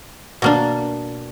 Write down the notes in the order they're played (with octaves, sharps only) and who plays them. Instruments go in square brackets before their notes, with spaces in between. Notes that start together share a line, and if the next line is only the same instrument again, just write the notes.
[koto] B2 A#3 D4